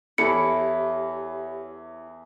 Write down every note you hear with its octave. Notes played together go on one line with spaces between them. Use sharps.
E2 E4 G4 A4 C#5 C#7